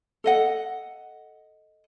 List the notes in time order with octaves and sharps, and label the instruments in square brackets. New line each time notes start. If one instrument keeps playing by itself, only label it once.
[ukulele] A4 D#5 F#5